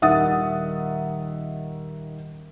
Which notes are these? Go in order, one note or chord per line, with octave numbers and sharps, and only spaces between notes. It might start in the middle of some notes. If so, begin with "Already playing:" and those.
D#1 D#3 E5 F#5 D#6 A6